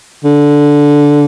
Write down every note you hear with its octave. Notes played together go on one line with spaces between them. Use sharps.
D3